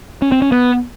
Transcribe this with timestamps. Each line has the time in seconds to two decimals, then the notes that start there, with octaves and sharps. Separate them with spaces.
0.22 C#4
0.32 C4
0.42 C#4
0.52 B3